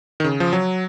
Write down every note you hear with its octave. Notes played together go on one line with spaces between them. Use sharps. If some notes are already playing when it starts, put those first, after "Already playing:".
D#3
C#3
F3
F#3